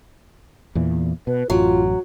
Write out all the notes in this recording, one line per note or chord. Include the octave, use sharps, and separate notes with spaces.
E2 A#2 E3
B2 B4
A1 F#2 F#3 F4